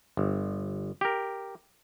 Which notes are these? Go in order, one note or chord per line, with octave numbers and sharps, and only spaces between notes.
G1
G4 A#4